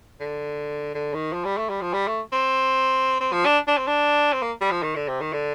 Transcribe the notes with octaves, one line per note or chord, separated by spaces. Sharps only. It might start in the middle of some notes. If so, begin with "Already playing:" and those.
D3
D3
D#3
F3
G3
A3
G3
F3
G3
A3
C4
C4
F3
D4
D4
C4
D4
C4
A#3
G3
F3
D#3
D3
C3
D#3
D3